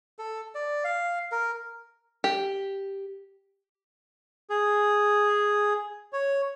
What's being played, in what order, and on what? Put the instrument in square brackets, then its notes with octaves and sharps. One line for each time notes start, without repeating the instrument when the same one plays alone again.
[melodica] A4
D5
F5
A#4
[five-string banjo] G4
[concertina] G#4
C#5